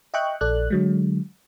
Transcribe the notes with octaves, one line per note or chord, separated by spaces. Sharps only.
D#5 E5 G5 C#6 F#6
A#1 A4 D5 F#6
D3 F#3 G#3